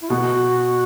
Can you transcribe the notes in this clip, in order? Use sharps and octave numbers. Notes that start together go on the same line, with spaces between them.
E4
B2 F#4